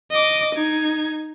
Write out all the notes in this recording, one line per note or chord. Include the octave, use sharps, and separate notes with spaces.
D#5 D6
D#4 G#6